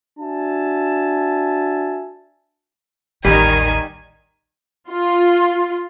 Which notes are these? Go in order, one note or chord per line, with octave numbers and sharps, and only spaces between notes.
D4 F#4 E5 G#5 A5
A1 D#2 D#3 G3 G#5
F4